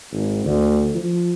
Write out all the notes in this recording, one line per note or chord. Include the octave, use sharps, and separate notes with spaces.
G#1
D2
F3